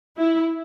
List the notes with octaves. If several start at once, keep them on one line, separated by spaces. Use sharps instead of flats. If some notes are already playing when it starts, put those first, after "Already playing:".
E4